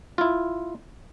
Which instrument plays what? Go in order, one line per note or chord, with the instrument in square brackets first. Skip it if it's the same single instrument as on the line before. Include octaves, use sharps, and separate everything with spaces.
[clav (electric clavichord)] E4 F4